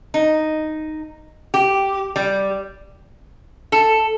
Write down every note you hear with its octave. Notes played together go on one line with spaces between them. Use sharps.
D#4
G4
G3
A4